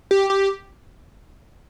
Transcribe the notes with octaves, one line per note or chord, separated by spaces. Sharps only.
G4
G4